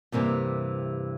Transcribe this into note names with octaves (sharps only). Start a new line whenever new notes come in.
G2 C3 E3 A#3